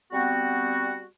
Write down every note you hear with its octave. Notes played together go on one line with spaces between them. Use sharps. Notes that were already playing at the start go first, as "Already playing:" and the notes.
G3 B3 C4 F#4